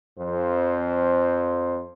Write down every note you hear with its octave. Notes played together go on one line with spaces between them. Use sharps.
F2 C5